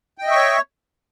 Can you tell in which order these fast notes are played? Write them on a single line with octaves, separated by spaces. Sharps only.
G5 D#5 E5 C#6 C#5